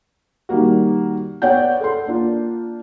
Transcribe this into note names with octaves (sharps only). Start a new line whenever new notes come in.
D#3 G3 A#3 F#4
B3 C#5 D5 F#5 G5 G6
A4 F#5 C6
A#3 D4 F4